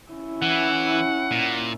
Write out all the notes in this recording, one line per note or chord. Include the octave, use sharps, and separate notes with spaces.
C#4 E4
E3 F#5
A#2